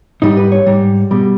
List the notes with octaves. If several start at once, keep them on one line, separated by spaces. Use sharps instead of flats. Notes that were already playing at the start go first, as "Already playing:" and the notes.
G#2 G3 D#4
B4
C#5
G#2 G3
B2 G3